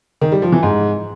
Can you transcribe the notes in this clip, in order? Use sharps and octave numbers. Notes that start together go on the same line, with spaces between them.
D#3
G3
F3
E3
G#2